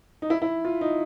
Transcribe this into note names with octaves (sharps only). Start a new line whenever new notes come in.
D#4
E4
E4
F4
D#4